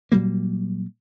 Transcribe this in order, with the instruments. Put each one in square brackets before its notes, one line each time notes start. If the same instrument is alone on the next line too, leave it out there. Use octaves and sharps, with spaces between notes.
[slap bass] A#2 F#3 G3 A#3